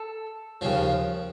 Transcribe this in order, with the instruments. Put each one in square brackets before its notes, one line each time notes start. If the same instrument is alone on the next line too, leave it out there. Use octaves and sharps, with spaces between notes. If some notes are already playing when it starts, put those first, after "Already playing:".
Already playing: [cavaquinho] A4
[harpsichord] D#2 C#3 F3